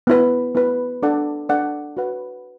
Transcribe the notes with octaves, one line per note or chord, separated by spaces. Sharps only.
B3 E4 B4
B3 E4 B4
D4 A4 D5 F#5
D4 A4 D5 F#5
F#4 B4 F#5